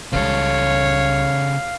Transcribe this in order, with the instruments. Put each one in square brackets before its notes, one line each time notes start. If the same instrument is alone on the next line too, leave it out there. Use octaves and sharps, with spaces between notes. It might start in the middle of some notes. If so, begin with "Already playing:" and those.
[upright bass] C#2 G3 [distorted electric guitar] C#3 A4 [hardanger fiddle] C#5 [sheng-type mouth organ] F5